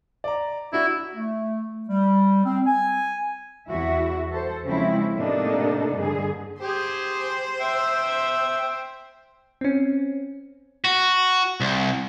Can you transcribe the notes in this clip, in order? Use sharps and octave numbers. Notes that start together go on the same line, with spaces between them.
D5 A#5
D4 E4 F#4
A3
G3
C4
G#5
E2 E4 F#4 E5
A4 C5
C#3 F3 G#3 C4 C#4 E4
A2 C3 A#3 D4 D#4 A4
G2 D3 G#4
G4 G#4 C5
E5 G5
C4 C#4
F#4
C2